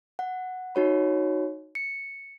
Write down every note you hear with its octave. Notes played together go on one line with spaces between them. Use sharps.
F#5
D#4 F#4 C#5 B5
C#7